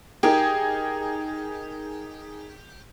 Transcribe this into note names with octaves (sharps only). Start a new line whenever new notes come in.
D#4 G4 G#4 A#4